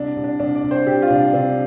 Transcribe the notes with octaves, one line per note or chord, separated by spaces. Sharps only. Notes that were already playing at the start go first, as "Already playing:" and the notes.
Already playing: C2 D4
C2
D4
C2 D4
D5
C2
C5
C3 G4
F4
C2 D4
C3 D4